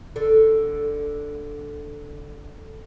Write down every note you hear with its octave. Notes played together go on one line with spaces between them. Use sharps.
D3 A4